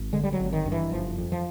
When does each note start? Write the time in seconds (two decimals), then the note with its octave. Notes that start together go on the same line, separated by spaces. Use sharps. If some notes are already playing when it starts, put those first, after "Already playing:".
Already playing: G#1
0.13 D3 G#3
0.24 G3
0.33 F#3
0.40 G#1
0.53 D#3
0.66 G2
0.72 E3
0.92 F#1 F3
1.18 F2
1.32 F3